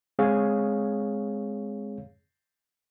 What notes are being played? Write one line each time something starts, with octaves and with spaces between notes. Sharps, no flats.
G#3 C4 G#4 C#5 F5